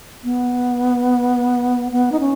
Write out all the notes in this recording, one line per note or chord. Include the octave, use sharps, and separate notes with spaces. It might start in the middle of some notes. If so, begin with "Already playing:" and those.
B3
B3
D#4
C#4